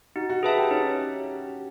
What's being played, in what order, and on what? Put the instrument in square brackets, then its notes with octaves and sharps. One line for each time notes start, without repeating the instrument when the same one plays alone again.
[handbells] D#4 [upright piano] F#4
[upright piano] F#4
[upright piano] F#4 [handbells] G#4 B4 E5 A5
[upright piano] G4
[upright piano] C#4 [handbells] D#4